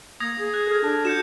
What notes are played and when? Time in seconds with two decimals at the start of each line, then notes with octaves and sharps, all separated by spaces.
0.20 A#3 D#6 G#6 A#6
0.39 G#4
0.54 F#6
0.67 A4 F6
0.84 D4 A5
1.05 F#4 G6 C#7 E7